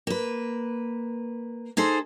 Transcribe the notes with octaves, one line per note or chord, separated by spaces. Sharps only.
A#3 B4
D#4 G#4 A4 C5